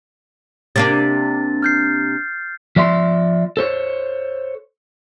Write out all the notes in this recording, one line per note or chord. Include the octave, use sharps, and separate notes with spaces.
C3 A#3 D4 A6
F6 G6 C7
F3 D5 E5 C6
A4 C5 C#5